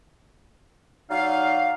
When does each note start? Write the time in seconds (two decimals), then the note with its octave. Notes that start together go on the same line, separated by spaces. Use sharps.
1.10 F#3 D#4 D5 F5